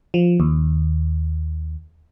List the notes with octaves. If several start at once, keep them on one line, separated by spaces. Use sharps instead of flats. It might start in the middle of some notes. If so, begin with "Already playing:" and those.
F3
D#2